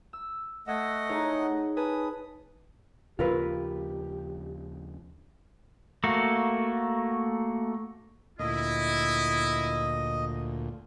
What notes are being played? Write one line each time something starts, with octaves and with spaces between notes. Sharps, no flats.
E6
A3 D#5 F#5 E6 G#6 B6
D#4 G#4 C#5
B4 G#5 A5 D#6
D#2 C#3 F3 F4 G4 A#4 B4
A3 A#3 F#4
D2 A#2 E4 D#5